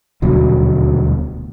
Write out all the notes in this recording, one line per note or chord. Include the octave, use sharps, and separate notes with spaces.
D#1 D2 B2 F#3